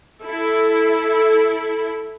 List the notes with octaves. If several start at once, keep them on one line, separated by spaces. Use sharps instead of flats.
E4 A4